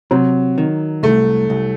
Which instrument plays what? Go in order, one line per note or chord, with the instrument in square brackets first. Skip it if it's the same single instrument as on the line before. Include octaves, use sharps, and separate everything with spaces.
[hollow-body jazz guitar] C3 [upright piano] F#3
[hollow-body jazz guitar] D#3
[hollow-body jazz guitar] C2 [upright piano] A3
[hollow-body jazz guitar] C2